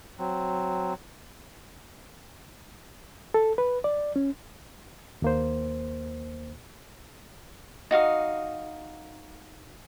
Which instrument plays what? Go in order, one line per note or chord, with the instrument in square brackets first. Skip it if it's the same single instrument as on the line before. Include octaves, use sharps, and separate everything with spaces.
[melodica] F#3 C4
[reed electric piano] A4
B4
D5
C#4
D#2 A#3 C5
[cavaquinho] D#4 F#4 F5 D#6